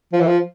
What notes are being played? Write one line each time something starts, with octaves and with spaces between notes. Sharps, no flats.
F3
E3
F3